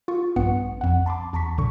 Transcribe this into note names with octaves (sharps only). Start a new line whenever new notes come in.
F4 C#6
A#1 G2 B3 F#5 C#7
F2 F#5
A5 B5 C6 D6
E2 A5 A#5 C#6 B6
C2 A#2 D3 C#6